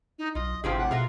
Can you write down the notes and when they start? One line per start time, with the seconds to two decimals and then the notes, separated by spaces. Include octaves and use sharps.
0.19 D#4
0.35 B1 F4 D#5
0.64 G#1 A2 C3 F3 F4 G4 G#4 F5
0.77 F#5
0.91 B2 F4 G#4 A#4 E5